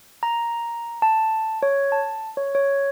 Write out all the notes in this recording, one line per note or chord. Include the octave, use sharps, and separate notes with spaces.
A#5
A5
C#5
A5
C#5
C#5